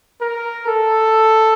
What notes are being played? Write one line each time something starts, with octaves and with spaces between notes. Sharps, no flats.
A#4
A4